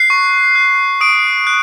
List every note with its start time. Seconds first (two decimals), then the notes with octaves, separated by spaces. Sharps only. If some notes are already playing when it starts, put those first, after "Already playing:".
Already playing: F#6 C7
0.10 C#6
0.55 F#6
1.01 D#6 D7
1.47 F#6